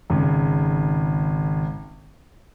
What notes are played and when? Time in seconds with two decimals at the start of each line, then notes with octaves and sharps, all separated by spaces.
0.10 G#1 C#3